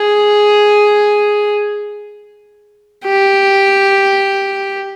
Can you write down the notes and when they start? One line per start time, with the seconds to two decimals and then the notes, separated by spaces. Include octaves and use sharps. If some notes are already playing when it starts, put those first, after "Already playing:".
Already playing: G#4
3.06 G4